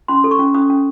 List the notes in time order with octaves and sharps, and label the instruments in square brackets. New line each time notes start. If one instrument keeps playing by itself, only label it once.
[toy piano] C#4 C6
A4
C#6
C#4
C#4 D#6
C#4